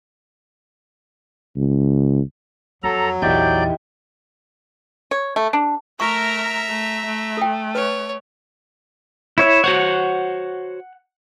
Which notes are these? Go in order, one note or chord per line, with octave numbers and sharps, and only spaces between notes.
C#2
F2 F#3 A4 A#5
A#1 E2 D#4 E4 G4 D5 G6
C#5
A3
D4
A3 A#4 E5 A#5 C#6
A3
A3
A4 G5
B4 C#5
E4 C#5 E5
F#4 C5 C#5 F#5